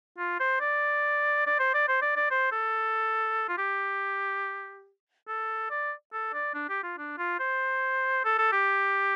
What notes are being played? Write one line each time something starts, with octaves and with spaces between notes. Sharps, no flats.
F4
C5
D5
D5
C5
D5
C5
D5
D5
C5
A4
F4
G4
A4
D5
A4
D5
D4
G4
F4
D4
F4
C5
A4
A4
G4